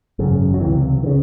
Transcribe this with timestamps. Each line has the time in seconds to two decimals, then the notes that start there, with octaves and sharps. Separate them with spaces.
0.19 G#1 F#2 C#3
0.54 F#3
0.60 C#2 C3 E3
1.03 D#3
1.06 C#3